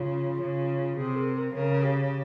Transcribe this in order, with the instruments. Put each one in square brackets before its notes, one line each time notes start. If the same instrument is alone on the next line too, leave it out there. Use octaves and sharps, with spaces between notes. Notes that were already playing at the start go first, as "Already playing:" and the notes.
Already playing: [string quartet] C#3 [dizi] F4
[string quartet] C#3
[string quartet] C3 [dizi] G#4
[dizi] A#4
A#4
[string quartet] C#3 [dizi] A#4
[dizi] G4